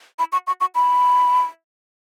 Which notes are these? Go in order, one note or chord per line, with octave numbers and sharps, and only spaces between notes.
B5
C#6
C#6
C#6
B5